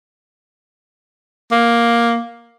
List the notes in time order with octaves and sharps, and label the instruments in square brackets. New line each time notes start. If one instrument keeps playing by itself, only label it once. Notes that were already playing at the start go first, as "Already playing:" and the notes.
[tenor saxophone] A#3